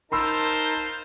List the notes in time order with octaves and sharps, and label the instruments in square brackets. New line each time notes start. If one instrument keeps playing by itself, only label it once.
[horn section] D#4 A5 [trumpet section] F4 C5 [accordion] A#4 [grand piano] B5 C6 E6